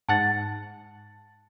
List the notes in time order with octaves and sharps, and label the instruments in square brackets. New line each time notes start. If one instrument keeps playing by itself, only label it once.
[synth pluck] G#2 F#5 [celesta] A5 A6